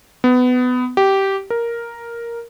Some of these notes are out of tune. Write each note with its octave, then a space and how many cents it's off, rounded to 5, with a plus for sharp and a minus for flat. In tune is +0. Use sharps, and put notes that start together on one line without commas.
B3 +20
G4 -15
A#4 +5